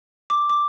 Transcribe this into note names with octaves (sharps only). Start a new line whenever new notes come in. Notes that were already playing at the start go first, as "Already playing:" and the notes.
D6
D6